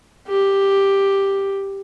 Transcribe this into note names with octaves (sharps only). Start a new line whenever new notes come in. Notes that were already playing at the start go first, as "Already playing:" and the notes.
G4